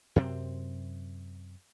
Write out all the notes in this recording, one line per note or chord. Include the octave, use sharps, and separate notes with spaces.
F#2 C3 C4